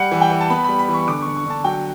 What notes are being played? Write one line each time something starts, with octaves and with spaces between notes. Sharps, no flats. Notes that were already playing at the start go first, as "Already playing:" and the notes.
Already playing: G3 F#5
E3
G5
E3
A5
B3 B5
G3 B5
B5
E3 C#6
D3 D6
C#6
D3
C#6
D3 A5
F#3 G5